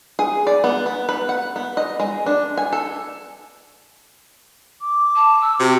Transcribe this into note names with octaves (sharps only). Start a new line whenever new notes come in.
G#4
D5
B3
B3
B4
F#5
B3
D#5
G#3
D4
G#5
A4
D6
A5
E6
C3 F#4